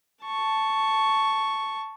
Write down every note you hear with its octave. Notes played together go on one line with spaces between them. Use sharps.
A5 C#6